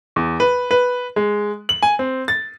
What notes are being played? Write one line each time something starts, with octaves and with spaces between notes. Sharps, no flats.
E2
B4
B4
G#3
F#7
G#5
C4
A6